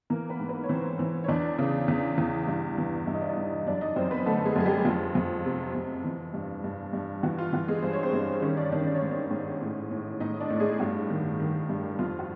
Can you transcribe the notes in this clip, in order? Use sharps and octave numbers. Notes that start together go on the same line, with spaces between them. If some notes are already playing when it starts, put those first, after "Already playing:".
E3 A#3 A#4
B3 B4
G#2
B3 B4
C#5
E3 C4 C5
E3
C#5
E2 D4 D5
C#3
E2
E2
G2
E3
G2 E5
D#5
D5
D#4 D#5
G2
F#2 D4 D5
D#4 D#5
F#2 C4 C5
B3 B4
D3 A3 A4
G#3 G#4
F#2 G#4
G3 G4
F2 F4
F2
C3
F2
E3
G2
G2
G2
E3 F#4
F4
E3 F#4
G#3 G#4
G2 C5
C#5
C4 C5
G2
D#3 C#4 C#5
D4 D5
D#3 D4 D5
D5
C#5
G#2 C5
C#4 C#5
G#2
A2
A2
A2 D#4 D#5
D4 D5
A2
G#3 G#4
G2 F#4
D#3
D#3
G2
F2 F4
F#4